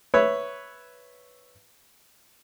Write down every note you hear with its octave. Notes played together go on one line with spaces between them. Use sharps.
B4 C#5 E5